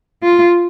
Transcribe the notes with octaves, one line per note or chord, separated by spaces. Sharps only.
F4